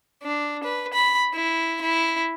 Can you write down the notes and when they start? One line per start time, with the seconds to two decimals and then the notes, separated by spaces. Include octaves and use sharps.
0.23 D4
0.64 B4
0.93 B5
1.34 E4
1.81 E4